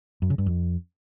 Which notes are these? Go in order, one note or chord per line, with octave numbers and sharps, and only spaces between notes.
F#2
C#3
G2
F2